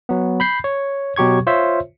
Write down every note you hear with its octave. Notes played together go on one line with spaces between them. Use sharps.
F#3 B3
B5 G6 C7
C#5
B2 F#3 G4 C#6 G#6
F4 C5 C#5 E5